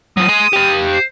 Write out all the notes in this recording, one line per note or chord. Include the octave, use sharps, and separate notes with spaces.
F#3 F4 D#6
G#4 C6
G4 F5
C5